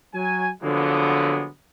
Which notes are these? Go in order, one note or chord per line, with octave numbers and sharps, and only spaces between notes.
F#3 G#5
D3 F3 F#3 G#3 A#3 B3